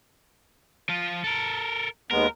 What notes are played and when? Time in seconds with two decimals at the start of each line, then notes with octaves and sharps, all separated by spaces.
0.89 F3 F4
1.24 A4 A#4
2.11 D#2 G#3 B3 A#4